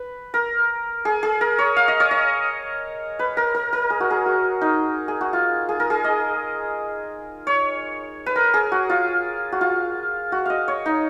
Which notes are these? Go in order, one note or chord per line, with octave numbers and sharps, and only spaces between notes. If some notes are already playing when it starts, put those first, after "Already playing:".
Already playing: B4
A#4
G#4
G#4
A#4
C#5
F5
D#5
C#5
D#5
B4
A#4
A#4
A#4
G#4
F#4
G#4
F#4
D#4
G#4
F#4
F4
G#4
A#4
G#4
D#5
C#5
B4
A#4
G#4
F#4
F4
F#4
F4
F#4
D#5 F5
C#5
D#4